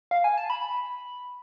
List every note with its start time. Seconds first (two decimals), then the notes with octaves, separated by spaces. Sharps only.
0.11 F5
0.24 G#5
0.37 A5
0.50 B5